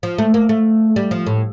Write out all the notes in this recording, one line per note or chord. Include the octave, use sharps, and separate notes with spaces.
F3
A3
A#3
A3
G3
F3
A2